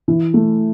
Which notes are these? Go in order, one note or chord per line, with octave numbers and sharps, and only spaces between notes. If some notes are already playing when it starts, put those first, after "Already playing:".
E3
A3